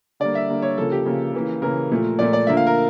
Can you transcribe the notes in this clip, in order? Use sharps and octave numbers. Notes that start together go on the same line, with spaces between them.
D3 G3 A#3 D5
E5
D3 G3 A#3
C#5
C#3 F3 A#3 A4
G4
C#3 F3 A#3
C#3 E3 A#3
C#3 E3 A#3 A#4
A#2 F3 A3
A#2 F3 A3 D5
D5
D3 F3 A#3 E5
F5
A#4